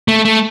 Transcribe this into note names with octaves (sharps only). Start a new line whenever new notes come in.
A3
A3